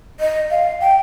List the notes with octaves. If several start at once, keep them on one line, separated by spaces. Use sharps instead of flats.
D#5
F5
G5